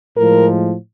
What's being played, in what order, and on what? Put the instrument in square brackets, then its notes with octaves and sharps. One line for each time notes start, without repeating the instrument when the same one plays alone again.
[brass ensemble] A2 F3 G#3 A#4